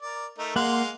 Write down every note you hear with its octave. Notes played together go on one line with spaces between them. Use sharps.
A#4 D5
A3 D#4 A#4
G#3 A#3 F5 F#5 C6